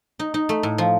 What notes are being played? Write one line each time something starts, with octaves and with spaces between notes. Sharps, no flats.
D#4
D#4
A3
A2
F3